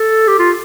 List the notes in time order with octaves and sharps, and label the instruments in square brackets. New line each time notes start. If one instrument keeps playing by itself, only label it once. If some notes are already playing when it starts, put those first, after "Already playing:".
Already playing: [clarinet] A4
G4
F4